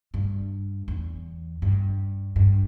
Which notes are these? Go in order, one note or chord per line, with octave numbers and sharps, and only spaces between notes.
G2
E2
G2
G2